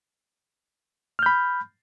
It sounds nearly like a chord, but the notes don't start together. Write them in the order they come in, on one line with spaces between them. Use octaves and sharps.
F6 G6 B5